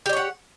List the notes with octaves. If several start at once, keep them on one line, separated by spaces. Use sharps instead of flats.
G4 C#5 D5 F#5